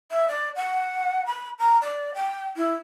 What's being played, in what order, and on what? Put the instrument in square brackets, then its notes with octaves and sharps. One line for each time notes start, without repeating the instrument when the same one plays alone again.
[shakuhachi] E5
D5
F#5
B5
A#5
D5
G5
E4